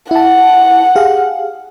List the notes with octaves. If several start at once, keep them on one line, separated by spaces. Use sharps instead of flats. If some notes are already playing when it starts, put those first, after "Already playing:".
E4 F#5 A5
G4 G#4 F5